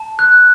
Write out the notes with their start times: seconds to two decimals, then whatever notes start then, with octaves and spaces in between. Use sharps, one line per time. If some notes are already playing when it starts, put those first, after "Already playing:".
Already playing: A5
0.19 F#6